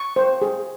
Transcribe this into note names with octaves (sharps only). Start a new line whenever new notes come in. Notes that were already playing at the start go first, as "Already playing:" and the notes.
Already playing: C#6
C5
G#4